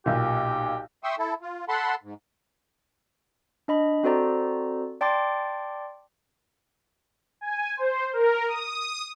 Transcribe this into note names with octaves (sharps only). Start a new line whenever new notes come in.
B1 A#2 G4
E5 G5 C6 C#6 D#6 E6
E4 A4
F4
A4 F#5 A5 B5 C6
G#2
D4 D#5 B5
C4 F#4 A4 C5 D5 A#5
D5 G5 A5 C6 D6 A6
G#5
C5
A#4
D#6